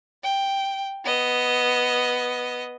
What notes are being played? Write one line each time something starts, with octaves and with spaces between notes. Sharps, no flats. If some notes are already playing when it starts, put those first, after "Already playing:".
G5
B3 D#5